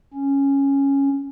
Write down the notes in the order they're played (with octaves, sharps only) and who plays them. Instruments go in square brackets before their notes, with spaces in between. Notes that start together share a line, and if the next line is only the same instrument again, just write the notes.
[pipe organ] C#4